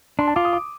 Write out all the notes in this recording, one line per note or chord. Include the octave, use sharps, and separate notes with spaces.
D4 C6
A5
F4 D6
D#6
D6